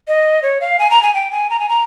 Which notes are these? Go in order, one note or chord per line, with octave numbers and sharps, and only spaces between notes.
D#5
C#5
F5
G#5
A#5
G#5
G5
G#5
A#5
G#5
A#5